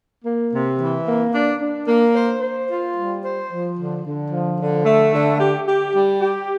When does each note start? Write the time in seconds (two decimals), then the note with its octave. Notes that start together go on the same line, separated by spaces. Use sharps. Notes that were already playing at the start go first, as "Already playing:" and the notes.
0.25 A#3
0.52 C3
0.79 E3
1.06 A#3
1.33 D4
1.60 D4
1.87 A#3
2.15 C5
2.41 C5
2.69 F4
2.95 G3
3.23 C5
3.51 F3
3.77 D3
4.04 D3
4.31 F3
4.59 D3
4.85 A3
5.13 D3
5.40 G4
5.67 G4
5.94 G3
6.21 G4